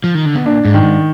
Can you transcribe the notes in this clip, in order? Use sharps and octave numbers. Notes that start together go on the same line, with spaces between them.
F3
D#3
D3
B2
A#2 D4
G#2
D#3
G#2